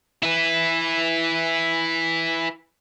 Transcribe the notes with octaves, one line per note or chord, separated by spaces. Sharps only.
E4 B4